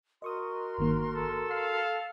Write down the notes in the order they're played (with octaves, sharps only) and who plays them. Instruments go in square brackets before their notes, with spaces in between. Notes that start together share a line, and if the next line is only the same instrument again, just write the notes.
[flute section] F#4 A#4 C6 [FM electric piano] D#5 C#6 D#6
[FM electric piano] G1 D#3 A#3
[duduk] A4
[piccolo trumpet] F5 [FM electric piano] C7